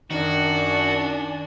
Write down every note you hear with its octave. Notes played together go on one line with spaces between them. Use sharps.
F#2 D#3 D4 F#4 G#5